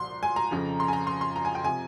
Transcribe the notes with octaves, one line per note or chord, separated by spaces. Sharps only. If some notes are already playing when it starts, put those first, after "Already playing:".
Already playing: C2 A#2 F3 C6
G#5
A#5
F2 C#3 F3
C6
G#5
A#5
C6
C6
A#5
G#5
G5
C3 F3 G#5